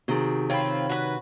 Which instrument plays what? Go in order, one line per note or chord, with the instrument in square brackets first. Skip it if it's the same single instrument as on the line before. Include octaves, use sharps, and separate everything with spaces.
[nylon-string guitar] C3 D#3 [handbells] F#4 G#4
[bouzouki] C4 F4 [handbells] C#5 B5
[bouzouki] F#4 B4